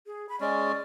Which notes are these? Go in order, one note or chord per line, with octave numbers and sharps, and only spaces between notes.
G#4
B5
G#3 C#4 D5